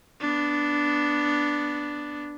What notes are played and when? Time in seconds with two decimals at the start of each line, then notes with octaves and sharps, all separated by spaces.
0.21 B3 D4